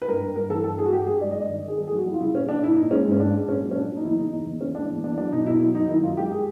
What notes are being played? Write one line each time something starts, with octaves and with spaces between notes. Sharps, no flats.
B4
G2 A#4
G2
G2 A#4
E3 A4
G2 A4
G2 G#4
F#4
G2 G4
G2 G#4
G#3 D5
D#5
G2 D5
D#3
D#3 G#4
G3 A4
G#4
F2 F#4
G3 E4
F4
C#3 E4
A#2 C#4
F3 D4
A#2 E4
A#2 D#4
G#3 C#4
G#2
C#4
G#2 D4
G#3
A#2 C#4
F#3
C#4
A#2 D4
F#3
D#4
E2 E4
C#3 D#4
E2
E2
E2 C#4
G#3 D4
E2
E2 D4
F#3 D4
B2 D#4
B2 E4
F#3 E4
F#2 D#4
D#3 E4
F#2 F4
G#3 G4
G#4